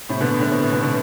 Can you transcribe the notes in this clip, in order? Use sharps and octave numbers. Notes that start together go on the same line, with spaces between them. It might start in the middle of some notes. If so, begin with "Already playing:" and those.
A2 C3
B2 D3
B2 D3
B2
A2
B2
B2 D3